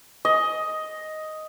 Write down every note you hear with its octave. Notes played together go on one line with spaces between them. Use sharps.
D#5